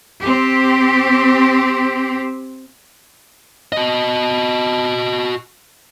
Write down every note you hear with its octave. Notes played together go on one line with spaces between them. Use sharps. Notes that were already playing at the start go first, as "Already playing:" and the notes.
C4 G4
F#4 D#5